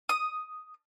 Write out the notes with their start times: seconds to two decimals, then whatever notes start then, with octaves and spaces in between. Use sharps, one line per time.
0.09 D#6